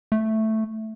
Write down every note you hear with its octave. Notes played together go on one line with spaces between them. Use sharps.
A3